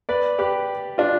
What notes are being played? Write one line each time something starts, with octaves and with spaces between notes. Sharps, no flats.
B4 D5
G4 B4
D4 F4